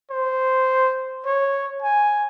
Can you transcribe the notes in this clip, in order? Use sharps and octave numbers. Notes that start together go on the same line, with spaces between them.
C5
C#5
G#5